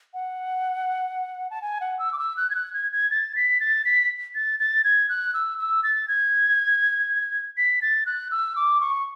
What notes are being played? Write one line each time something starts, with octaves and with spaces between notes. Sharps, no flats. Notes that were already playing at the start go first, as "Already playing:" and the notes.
F#5
A5
G#5
F#5
E6
D6
E6
F#6
G#6
F#6
G#6
G#6
A6
B6
A6
B6
A6
A6
G#6
F#6
E6
E6
A6
G#6
B6
A6
F#6
E6
D6
C#6